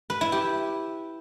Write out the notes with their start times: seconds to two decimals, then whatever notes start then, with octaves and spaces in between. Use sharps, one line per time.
0.10 B4
0.21 E4
0.32 G4